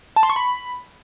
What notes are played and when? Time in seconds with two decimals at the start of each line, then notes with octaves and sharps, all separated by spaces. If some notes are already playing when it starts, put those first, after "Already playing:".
0.16 A5
0.23 C6
0.30 C#6
0.36 B5